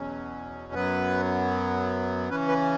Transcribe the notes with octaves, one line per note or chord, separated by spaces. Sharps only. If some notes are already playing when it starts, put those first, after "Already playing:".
Already playing: E2 B2 F#3 C#4
F#2 F#3 B3 B4
C#3 E3 C#4 B4
B4